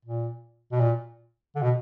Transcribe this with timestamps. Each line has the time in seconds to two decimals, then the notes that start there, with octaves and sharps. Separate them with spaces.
0.05 A#2
0.72 B2
0.80 A#2
1.55 D3
1.62 B2